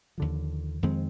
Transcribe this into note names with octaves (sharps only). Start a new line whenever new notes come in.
D#2 D3 F3
F2 D#3 G#3 C4